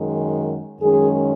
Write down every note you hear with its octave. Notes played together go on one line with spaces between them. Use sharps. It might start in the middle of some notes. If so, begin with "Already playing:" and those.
Already playing: F#2 D#3 G#3
F#2 D#3 G#3 C#4 G#4